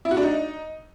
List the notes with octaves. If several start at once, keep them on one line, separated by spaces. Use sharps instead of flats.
E4
F#4
D4
D#4